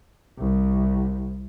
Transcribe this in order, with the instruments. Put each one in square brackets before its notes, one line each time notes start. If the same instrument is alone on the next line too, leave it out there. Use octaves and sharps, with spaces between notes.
[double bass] C2